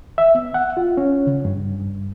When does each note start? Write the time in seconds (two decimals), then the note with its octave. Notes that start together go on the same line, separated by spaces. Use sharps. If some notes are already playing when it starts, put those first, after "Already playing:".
0.18 E5
0.35 B3
0.54 F#5
0.77 F4
0.97 C#4
1.27 C#3
1.45 G2